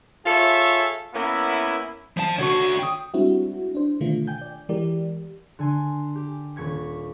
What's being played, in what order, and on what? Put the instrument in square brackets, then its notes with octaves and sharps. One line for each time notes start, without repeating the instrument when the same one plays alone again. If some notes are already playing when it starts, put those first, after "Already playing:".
[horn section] F4 G#4 A4 C#5 E5
A#3 B3 C#4 E4
[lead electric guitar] F3 A5
[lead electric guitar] D3 F#4 [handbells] C#5 C#6
[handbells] G5 D#6
[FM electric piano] G3 G#3 C4 D4 E4 F#4
D4 C5
B2 D3 D#3 A3 D4 F4
G5 G#5 G6
D5
E3 G#3 G4 A#4 D5
[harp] D3 G#5 C6
G4
D#1 C#6 G#6 B6